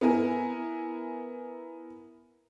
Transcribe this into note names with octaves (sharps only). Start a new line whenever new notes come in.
B3 E4 A#4 G#5